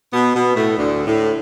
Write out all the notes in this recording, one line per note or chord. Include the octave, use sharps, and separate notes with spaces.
B2 B3
B2 B3
A2 A3
D2 D3
A2